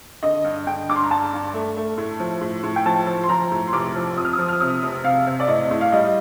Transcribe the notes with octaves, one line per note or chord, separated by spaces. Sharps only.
D3 D#5
G2
D3 G5
G2 D6
C6
A#5
G2 A5
G2
A3
A3
A2
F3
A2
A2
G5
F3 A5
F3
C6
F3 A#5
A2
C6
F1 D6
F3
F2 D#6
F6
D#6
F3
F6
C3 D#6
F1
C3 F5
C3
D5
A2 D#5
A2
F5
G3 D#5